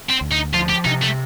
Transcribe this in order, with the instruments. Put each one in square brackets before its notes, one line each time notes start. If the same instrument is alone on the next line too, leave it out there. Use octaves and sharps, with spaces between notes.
[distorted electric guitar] C4
[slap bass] D2
[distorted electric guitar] D#4
[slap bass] F3 [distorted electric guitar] F4
[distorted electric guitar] G4
[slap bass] C3 [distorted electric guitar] D#4
[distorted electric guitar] A3